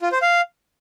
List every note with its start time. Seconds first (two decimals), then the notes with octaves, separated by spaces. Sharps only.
0.02 F4
0.12 C5
0.22 F5